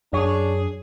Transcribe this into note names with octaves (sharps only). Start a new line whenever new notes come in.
F#2 D4 G#4 C#5